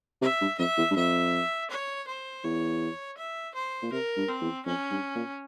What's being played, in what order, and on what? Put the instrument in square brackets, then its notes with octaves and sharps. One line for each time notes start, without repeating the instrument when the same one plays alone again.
[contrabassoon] C3 [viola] E5
[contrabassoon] G2
[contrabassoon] F2 [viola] E5
[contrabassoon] E2
G2
[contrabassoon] F2 [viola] E5
[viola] C#5
C5
[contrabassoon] E2 [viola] C#5
[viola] E5
C5
[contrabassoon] A#2
[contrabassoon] C3 [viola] A#4
[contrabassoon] G2
[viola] C4
[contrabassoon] E2
[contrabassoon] F2 [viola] C#4
[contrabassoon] G2
A#2